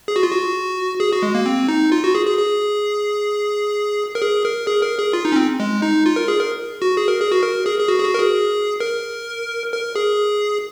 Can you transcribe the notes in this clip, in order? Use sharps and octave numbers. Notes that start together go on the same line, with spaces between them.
G#4
F#4
F4
F#4
G#4
F#4
G#3
A#3
C4
D#4
F4
F#4
G#4
G#4
G#4
A#4
G#4
A#4
G#4
A#4
G#4
F4
D#4
C#4
C4
G#3
D#4
F4
A#4
G#4
A#4
F#4
G#4
A#4
G#4
F#4
A#4
G#4
G#4
F#4
G#4
F#4
A#4
G#4
A#4
A#4
G#4